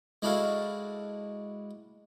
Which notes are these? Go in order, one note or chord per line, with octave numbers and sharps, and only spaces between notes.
G#3 D4 E4 F#4 A4 F5